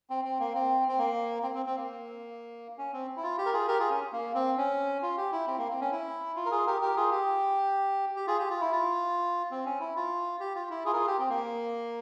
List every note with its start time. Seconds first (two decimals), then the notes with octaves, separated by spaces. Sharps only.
0.10 C4
0.25 C4
0.39 A#3
0.54 C4
0.88 C4
0.98 A#3
1.43 C4
1.54 C4
1.66 C4
1.77 A#3
2.78 C#4
2.93 C4
3.17 E4
3.23 F4
3.38 G4
3.46 A#4
3.53 F4 G#4
3.68 G4 A#4
3.79 F4 G#4
3.90 C#4
4.12 A#3
4.35 C4
4.58 C#4
5.02 F4
5.17 G4
5.32 E4
5.47 C4
5.58 A#3
5.70 C4
5.81 C#4
5.92 E4
6.36 F4
6.45 A#4
6.51 F4 G#4
6.67 G4 A#4
6.81 G4 A#4
6.97 F4 G#4
7.11 G4
8.16 G4
8.27 F4 G#4
8.39 G4
8.50 F4
8.61 E4
8.72 F4
9.51 C4
9.65 C#4
9.81 E4
9.96 F4
10.40 G4
10.55 F4
10.70 E4
10.85 F4 G#4
10.93 A#4
10.96 F4 G#4
11.07 G4
11.19 C4
11.29 A#3